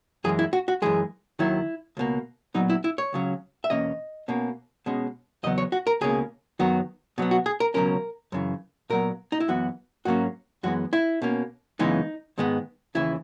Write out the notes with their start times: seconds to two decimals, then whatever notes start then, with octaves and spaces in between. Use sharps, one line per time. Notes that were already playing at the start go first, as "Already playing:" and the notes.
0.24 F#2 E3 G#3 G#4
0.39 E4
0.53 F#4
0.68 F#4
0.82 F#2 E3 G#3 G#4
1.39 D#2 D#3 F#3 E4
1.97 C#2 B2 A#3
2.54 A#2 F#3 B3 D#4
2.70 E4
2.84 E4
2.98 C#5
3.13 C#2 C#3 F#3 C#4
3.64 E5
3.70 E2 B2 A#3 C#4 D#5
4.28 B2 A#3 C#4
4.86 B2 G#3 C#4
5.43 E2 C#3 F#3 B3 D#5
5.58 C#5
5.72 F#4
5.87 A#4
6.01 C#2 B2 A#3 C#4 G#4
6.59 F#2 D#3 F#3 B3 F#4
7.18 B2 F#3 B3
7.31 F#4
7.46 G#4
7.60 A#4
7.74 C#2 B2 F#3 C#4 A#4
8.32 F#2 C#3 E3
8.90 A#2 F#3 B3 A#4
9.32 D#4
9.40 E4
9.48 F#2 E3 B3 F#4
10.05 G#2 F#3 A#3 C#4 F#4
10.63 F#2 E3 G#3 B3 F#4
10.93 E4
11.22 B2 A#3 C#4
11.79 F#2 C#3 E3 G#3 B3 D#4
12.38 G#2 D#3 G#3 B3
12.95 D#2 C#3 E3 E4